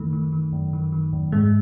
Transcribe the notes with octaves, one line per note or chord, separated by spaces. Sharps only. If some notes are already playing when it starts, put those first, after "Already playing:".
Already playing: F#2 D#3 A3
D#3
D#3
F#2
D#3
D#3
F#2
G#2 G#3